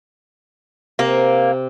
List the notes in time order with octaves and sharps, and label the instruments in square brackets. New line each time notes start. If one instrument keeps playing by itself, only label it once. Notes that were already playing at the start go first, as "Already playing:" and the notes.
[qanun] C3 [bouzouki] A#3